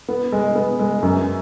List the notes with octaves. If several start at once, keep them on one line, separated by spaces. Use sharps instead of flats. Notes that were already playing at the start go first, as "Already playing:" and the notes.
B3
G#3
B3
G#3
F#2